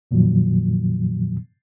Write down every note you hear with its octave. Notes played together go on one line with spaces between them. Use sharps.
F2 A#2 D#3 F3 F#3